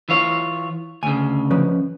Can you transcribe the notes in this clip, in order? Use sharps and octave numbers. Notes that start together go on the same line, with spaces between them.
E3 F4 C#5
D2 C#3 G#5
F3 C#4 B4